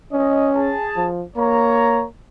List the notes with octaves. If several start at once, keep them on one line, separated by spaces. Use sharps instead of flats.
C#4 D#5
G#4 A5
F3
A#3 C#5 A#5